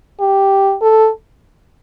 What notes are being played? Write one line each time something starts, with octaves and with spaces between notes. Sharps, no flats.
G4
A4